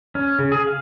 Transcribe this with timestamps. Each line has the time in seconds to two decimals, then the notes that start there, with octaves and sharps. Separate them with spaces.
0.15 C#4
0.39 C#3
0.52 G#4
0.67 F5